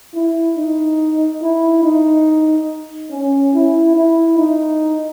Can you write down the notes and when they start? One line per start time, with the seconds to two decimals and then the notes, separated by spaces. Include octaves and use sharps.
0.14 E4
0.57 D#4
1.42 E4
1.84 D#4
3.11 C#4
3.54 E4
3.96 E4
4.38 D#4